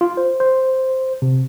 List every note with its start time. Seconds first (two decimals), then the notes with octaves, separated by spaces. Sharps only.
0.01 F4
0.17 C5
0.40 C5
1.22 C3